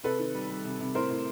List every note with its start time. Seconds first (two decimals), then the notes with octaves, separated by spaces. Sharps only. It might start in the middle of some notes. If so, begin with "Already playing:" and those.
0.03 C3 A4 B4
0.19 D#3
0.34 G3
0.50 G3
0.65 C3
0.80 C3
0.95 A2 A#4 C5
1.10 A2